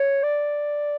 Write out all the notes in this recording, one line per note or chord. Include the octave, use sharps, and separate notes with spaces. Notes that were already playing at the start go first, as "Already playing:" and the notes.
Already playing: C#5
D5